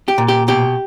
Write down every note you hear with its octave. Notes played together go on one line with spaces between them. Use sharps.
G4
A#2
G4
B2 G4